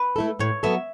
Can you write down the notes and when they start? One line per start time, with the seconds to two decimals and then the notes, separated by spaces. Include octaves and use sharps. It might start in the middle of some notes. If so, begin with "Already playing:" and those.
Already playing: B4
0.16 A3 E4 A4
0.39 A2 C#5
0.63 F#3 B3 A4 E5